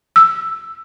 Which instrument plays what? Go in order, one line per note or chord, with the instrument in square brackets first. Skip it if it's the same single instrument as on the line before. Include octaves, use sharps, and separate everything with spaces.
[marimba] E6